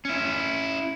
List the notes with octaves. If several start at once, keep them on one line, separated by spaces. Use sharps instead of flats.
C#4 E4